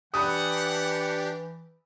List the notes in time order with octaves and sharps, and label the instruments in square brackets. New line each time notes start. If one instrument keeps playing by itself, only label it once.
[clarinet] E3 [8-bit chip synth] D4 G4 [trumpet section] F#5 [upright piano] B5 D#6